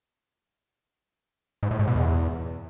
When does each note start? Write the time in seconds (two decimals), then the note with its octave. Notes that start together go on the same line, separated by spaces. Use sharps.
1.63 G#2
1.71 A2
1.79 G#2
1.87 B2
1.96 E2